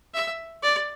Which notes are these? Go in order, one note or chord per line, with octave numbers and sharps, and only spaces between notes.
E5
D5